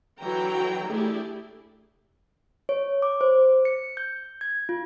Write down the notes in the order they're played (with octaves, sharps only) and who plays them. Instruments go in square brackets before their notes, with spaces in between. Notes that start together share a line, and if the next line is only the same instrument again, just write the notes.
[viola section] D3 E3 F#3 F#4 G5 A#5
A3 D4 E4 G4 G#4
[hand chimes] C#5
D6
C5
C#7
G6
G#6
F4